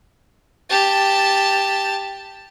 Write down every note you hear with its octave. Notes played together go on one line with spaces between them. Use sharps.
G4 A5